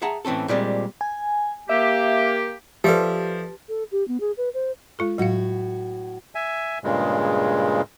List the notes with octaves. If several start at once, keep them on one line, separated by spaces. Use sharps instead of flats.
G#4 E5 F#5 A5 A#5
A2 E3 C4 C#4 A4
A#2 G3 G#3 C4
G#5
A#3 G4 E5
F3 G4 A4 B4 D5 E5
A4
G4
B3
G#4
B4
C5
G#3 F4 A4
A2 F#3 F#4 F5
E5 G#5
G2 A#2 C#3 G#3